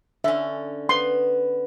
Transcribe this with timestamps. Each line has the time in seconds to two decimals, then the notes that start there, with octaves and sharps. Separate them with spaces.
0.24 D3 C#4 E5
0.89 B3 C6